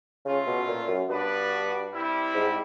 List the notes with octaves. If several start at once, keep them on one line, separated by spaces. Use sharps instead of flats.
C#3 A3 C#4 F4
B2
A#2
F#2
G2 B3 D4 F#4 B4 D5
G3 C4 E4 G4
G#2